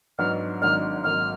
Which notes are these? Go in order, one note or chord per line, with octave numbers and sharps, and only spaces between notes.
G#2 F#3 B3 D4 F6
G#1 G#2 F#3 A#3 D4 F6
G#1 G#2 F#3 A#3 F6